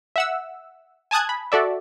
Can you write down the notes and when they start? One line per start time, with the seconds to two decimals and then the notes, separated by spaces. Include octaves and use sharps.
0.16 E5 F#5 E6
1.11 G#5 A5 D#6 F#6 G#6
1.29 B5
1.52 F#4 A4 D5 E5